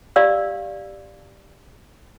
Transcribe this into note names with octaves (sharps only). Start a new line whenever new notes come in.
G4 D5 F5 E6